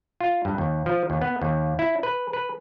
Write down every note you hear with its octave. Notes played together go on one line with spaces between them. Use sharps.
F4
G2
D#2
F3
D#2
B3
D#2
E4
B4
B4